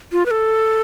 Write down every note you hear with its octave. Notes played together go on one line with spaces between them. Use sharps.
F4
B4
A4